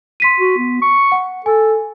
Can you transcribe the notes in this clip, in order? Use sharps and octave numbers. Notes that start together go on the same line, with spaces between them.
C6 B6 D#7
F#4
B3
C#6
F#5
A4 G#5